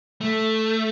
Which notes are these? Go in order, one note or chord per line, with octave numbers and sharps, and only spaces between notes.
A3